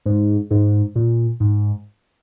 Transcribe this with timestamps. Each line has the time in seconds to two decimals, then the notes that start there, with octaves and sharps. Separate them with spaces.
0.06 G#2
0.51 G#2
0.96 A#2
1.40 G#2